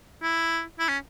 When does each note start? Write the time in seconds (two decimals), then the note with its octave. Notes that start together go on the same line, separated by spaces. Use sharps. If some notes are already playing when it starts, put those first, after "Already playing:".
0.22 E4
0.79 E4
0.89 C#4